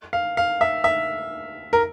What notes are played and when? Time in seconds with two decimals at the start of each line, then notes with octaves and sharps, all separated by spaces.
0.13 F5
0.37 F5
0.61 E5
0.84 E5
1.73 A#4